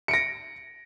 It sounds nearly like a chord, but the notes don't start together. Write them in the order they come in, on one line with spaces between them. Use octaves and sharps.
C#7 D7 A#6